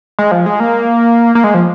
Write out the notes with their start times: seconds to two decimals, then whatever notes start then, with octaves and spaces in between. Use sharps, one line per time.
0.19 G#3
0.31 F3
0.46 G#3
0.60 A#3
1.35 A#3
1.44 G#3
1.54 F3